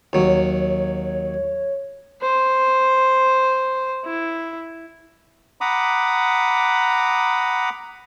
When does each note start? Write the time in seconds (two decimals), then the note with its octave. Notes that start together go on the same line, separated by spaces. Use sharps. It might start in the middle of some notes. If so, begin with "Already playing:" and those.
0.13 D#2 F#3 C#5
2.22 C5
4.05 E4
5.61 F#5 A#5 B5 D6 D#6